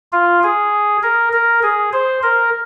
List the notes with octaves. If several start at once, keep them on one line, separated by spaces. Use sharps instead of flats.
F4
G#4
A#4
A#4
G#4
C5
A#4